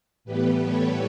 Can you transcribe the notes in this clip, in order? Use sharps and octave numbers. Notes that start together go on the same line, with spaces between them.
A2 E3 G3 B3 G4 B4
A4 C#5